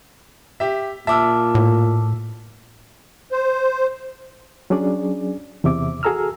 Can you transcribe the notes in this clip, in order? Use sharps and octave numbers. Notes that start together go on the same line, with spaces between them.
G4 E5
A#2 E5 A5 D6 E6 F6
A2
C5
F#3 C#4 D4 G#4 D5
E2 C3 E5 D6
F#4 G#4 A4 A#5 E6 F6